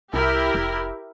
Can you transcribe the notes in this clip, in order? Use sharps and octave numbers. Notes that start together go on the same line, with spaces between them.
C2 E4 G4 A#4
F1